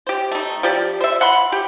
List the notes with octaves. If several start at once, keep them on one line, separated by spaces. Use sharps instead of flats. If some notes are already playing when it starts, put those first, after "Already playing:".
G4 C5
A3 D#4
F3 G4 D5
C5 E5
F#5 B5 C6
G4